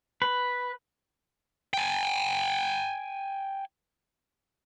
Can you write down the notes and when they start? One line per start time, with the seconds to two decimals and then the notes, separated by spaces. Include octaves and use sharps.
0.22 B4
1.74 G5 G#5